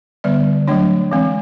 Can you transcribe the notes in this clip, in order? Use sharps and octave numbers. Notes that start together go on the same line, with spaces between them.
D3 G3 B3 D5
F#3 A3 D4 C#5
E3 G#3 C4